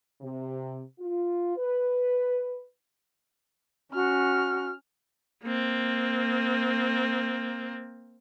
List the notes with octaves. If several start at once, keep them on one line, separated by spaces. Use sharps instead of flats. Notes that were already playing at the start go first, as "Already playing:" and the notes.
C3
F4
B4
C#4 F#4 F6
A#3 C4